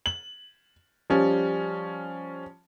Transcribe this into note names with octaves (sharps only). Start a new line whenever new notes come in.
F#7
F3 G3 C#4